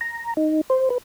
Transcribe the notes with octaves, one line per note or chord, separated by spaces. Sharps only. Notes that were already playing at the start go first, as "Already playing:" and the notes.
A#5
D#4
C5
B4